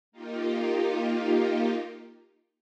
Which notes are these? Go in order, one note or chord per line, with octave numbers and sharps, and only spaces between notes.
A#3 D#4 F4 G4